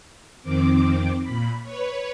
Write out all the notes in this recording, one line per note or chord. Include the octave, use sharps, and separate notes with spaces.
F2 D#3 C4 D6
A#2 B5
B4 C#5